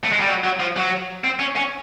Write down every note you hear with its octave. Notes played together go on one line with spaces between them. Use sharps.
A3
G#3
G3
F#3
F#3
F3
F#3
C4
C#4
C#4